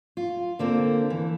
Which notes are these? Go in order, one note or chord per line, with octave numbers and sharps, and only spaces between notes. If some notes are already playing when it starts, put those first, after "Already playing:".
F4
D3 A#3 C4
E3